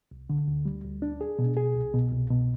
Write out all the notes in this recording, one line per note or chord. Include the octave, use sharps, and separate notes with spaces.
C2
D3
D2
G3
D2
D4
G#4
B2
G#4
C2
B2
C2
B2